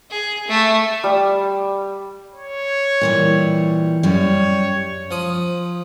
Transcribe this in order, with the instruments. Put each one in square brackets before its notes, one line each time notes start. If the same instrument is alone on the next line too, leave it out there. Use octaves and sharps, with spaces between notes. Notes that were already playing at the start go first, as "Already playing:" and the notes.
[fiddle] G#4
A3
[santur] G3
[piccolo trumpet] C#5
[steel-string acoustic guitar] A#2 E3 G3
[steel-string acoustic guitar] F#2 G3 [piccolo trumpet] C#5
[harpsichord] F3 D#6